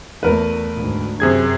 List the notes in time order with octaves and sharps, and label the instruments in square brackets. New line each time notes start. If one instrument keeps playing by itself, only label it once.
[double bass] E2 A3 [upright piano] A#4 B4
[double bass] D2 G#2
[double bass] F#2 F#3 [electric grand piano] C3 G#4 G#6